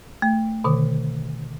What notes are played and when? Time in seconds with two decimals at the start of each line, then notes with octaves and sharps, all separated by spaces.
0.22 A3
0.64 B2 D3 D#3